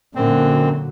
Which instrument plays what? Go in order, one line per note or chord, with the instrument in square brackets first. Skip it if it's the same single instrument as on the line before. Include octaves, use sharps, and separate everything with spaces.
[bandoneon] F#2 C4 [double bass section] A#2 D3 F#3